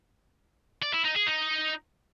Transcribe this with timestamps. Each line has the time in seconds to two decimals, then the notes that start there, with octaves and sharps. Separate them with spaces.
0.82 D5
0.93 E4
1.04 D#4
1.15 G#4
1.27 D#4